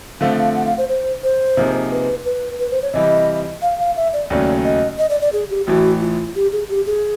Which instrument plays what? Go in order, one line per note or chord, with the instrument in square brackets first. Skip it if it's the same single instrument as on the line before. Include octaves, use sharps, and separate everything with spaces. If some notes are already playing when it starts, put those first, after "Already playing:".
[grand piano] D3 F3 A3 C4 [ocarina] F5
[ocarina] F5
F#5
F5
C5
C5
C5
[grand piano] C3 F3 A#3 D#4 G#4
[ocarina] B4
B4
B4
C5
C#5
[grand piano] C3 E3 G3 [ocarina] D#5
[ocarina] F5
F5
E5
D5
[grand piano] D#2 C#3 F#3 A3 C#4 [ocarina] D5
[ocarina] D#5
D#5
D5
D5
G#4
G4
[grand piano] A1 A2 E3 [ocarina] F#4
[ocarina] F4
G4
G#4
G4
G#4